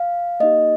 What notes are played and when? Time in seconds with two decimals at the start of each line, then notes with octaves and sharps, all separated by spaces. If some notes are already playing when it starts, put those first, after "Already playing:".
Already playing: F5
0.40 A#3 D#4 G4 D#5